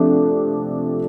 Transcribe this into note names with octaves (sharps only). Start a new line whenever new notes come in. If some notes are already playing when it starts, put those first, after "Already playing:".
Already playing: C3 F3 A3 D4